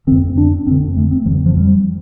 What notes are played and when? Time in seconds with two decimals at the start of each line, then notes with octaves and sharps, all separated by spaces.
0.07 D3 C4
0.11 F2
0.37 D4
0.67 F2 D3 C4
0.96 A3
1.11 C4
1.26 F2 D3 F3
1.46 F3
1.57 G3